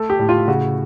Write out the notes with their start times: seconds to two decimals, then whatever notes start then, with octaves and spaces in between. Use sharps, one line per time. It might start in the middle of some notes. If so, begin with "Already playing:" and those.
Already playing: A3 A4
0.10 G4
0.19 A2
0.29 F4
0.48 C#3 F#4